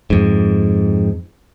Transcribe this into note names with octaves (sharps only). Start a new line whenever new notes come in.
F2 G#2